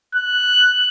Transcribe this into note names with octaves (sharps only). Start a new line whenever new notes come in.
F#6